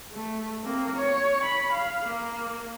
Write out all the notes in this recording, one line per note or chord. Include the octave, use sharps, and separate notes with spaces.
A3
A#3 C4
C#5
B5
F5
A#3